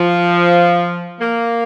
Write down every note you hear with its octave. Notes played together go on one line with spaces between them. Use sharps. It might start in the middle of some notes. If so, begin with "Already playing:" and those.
Already playing: F3
A#3